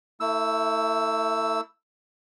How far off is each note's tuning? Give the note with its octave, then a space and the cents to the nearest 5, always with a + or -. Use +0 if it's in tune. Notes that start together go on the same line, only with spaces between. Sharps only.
A3 +35 E4 -5 E6 +0